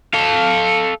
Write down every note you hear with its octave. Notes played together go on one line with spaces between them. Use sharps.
A4 F5